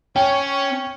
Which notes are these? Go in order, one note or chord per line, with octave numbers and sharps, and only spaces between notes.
C#4 C#5 G5